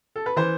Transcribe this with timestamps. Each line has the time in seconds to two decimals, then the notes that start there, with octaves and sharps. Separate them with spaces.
0.16 A4
0.26 B4
0.36 E3 C5